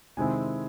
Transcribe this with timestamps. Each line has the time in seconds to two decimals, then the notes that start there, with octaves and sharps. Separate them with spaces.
0.17 C3 D#3 G#3 C4 E4 G#5